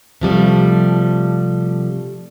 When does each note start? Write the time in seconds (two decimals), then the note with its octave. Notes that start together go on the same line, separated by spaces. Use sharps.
0.21 C3 F3 G3 A3